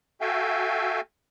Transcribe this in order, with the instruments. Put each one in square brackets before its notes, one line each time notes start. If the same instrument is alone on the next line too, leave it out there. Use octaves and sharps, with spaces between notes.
[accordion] F#4 A4 E5 F5 G5 G#5